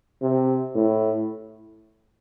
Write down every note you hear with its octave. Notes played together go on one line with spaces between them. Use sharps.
C3
A2